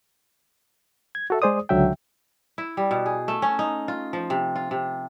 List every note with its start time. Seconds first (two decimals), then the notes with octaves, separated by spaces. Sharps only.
1.15 G#6
1.30 F#4 A4 E5
1.42 G#3 G#4 C5 D5 D#6
1.69 C#2 D3 F#3 E5 G5
2.58 E4
2.77 G3
2.91 B2
3.06 G#4
3.28 A3
3.42 C#4
3.59 D#4
3.88 F4
4.13 F3
4.30 C3
4.56 F4
4.71 C3